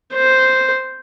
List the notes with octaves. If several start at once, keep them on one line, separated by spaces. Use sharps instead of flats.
C5